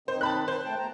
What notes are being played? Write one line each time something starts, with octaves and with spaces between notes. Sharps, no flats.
D#3 C4 D#4 C5
A5 B5 F#6
C5
A3 G5 A5
B2 A#5